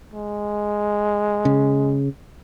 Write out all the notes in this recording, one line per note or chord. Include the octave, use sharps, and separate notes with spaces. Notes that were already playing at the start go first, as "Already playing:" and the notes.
G#3
C#3